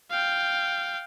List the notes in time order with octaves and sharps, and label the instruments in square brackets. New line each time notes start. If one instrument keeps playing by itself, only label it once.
[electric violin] F5 G5